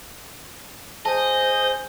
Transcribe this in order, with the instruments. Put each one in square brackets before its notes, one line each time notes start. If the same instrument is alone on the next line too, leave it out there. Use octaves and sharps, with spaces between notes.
[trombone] G#4 [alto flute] C5 [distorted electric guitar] D#5 [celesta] A5